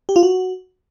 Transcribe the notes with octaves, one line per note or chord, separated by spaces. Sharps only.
G4
F4
F#4